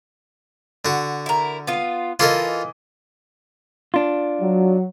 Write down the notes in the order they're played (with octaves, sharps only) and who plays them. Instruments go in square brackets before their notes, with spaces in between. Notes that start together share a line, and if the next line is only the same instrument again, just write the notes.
[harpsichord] D3 F#4
[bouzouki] E4 A#4
B3 F4
[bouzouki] E3 D#5 [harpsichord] F4 A4 A#4
[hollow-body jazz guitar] D4 F4
[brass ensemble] F#3